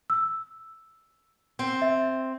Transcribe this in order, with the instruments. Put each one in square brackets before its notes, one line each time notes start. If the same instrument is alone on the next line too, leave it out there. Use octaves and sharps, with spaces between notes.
[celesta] E6
[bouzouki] C4
[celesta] E5